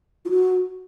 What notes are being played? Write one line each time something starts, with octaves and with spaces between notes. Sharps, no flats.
F4
F#4